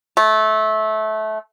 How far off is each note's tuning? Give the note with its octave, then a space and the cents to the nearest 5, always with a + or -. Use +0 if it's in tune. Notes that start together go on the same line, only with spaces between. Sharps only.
A3 -20